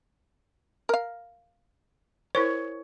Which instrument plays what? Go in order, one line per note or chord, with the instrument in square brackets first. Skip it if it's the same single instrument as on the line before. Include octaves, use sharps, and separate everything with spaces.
[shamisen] A#4 F5
[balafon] E4 A#4 C5 [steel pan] C#5